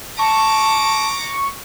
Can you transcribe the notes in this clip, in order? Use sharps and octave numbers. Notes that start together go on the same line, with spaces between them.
A5 A#5 C#6 D6